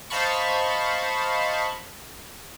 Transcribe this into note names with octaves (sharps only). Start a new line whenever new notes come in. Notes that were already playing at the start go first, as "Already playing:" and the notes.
C5 D#5 F5 A5 B5 C#6